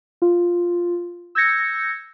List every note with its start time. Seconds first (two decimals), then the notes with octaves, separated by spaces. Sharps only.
0.22 F4
1.35 E6 G6 G#6 A#6 C#7